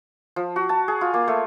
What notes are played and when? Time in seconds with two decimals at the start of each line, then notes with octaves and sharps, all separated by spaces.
0.36 F3
0.56 F#4
0.69 A5
0.88 G#4
1.01 F4
1.14 A#3
1.28 A3